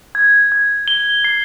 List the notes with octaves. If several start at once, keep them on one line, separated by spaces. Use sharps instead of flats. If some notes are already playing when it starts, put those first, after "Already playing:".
G#6
G#6
G7
C7